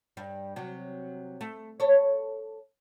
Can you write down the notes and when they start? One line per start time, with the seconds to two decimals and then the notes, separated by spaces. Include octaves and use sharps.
0.17 G2 G3
0.56 C3 F#3
1.41 A3
1.80 A4 C#5